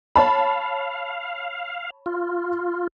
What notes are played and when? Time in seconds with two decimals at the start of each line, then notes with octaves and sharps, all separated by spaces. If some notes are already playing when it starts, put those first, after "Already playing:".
0.16 C#5 F5 A5 B5
2.06 F4